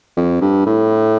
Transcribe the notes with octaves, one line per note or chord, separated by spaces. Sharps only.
F2
G2
A2